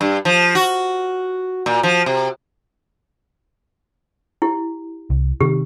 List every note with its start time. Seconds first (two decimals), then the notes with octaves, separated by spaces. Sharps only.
0.01 G2
0.25 F3
0.55 F#4
1.66 A#2
1.83 F3
2.06 C3
4.42 E4 G4
5.10 C2
5.41 C3 D#3 G4